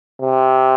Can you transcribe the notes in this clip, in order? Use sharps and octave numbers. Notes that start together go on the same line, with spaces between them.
C3